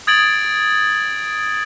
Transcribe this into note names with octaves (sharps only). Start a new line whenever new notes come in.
D#6 G#6 A6 D7 F#7